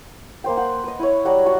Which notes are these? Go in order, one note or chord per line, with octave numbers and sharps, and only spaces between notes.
A#3 C5 G5
F#5 C6
B4 D#5
E4 C#5
F#3 G3 F#4 F#5
F#4 A5 C#6